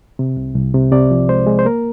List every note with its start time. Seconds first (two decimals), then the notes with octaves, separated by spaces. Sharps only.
0.19 C3
0.37 C2
0.55 C2
0.74 C3
0.92 C3 D5
1.11 F3
1.29 G#3 C5
1.47 G#3
1.59 C5
1.65 A#3 A#4